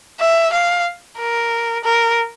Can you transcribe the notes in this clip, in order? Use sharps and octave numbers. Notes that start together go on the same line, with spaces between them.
E5
F5
A#4
A#4